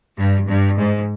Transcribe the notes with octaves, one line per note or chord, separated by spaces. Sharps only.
G2
G2
G#2